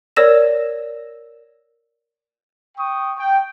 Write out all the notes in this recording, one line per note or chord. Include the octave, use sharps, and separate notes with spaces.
A#4 C#5 D5 E6 A#6 E7
G5 C#6 D#6
G5